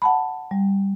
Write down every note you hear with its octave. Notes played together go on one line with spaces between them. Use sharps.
F#5 A5 B5
G3